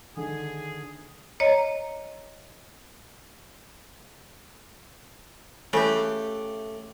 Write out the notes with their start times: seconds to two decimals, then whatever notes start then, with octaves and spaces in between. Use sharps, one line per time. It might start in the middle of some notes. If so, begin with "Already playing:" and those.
0.16 D3 D#3 G#4
1.40 C#5 D#5 A#5
5.73 C#3 E3 A3 G4